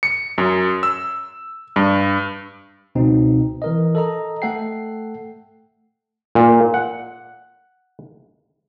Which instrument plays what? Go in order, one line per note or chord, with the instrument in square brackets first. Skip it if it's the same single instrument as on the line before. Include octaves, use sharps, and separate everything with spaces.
[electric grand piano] C#7
F#2
E6
G2
[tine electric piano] C#2 B2 C4 D#4
E3 A#4 D#5
A4 D#5 A#5
A3 A4 F#5 G5 C7
[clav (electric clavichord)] A#2
F#5